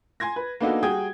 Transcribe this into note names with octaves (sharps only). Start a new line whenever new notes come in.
G#5 C6 G#6 A#6
B4
A#3 B3 D4 D#4 F#4 A4
G3 F#4 G#4 G5 D#6 G#6